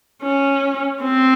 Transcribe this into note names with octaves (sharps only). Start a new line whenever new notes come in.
C#4
C4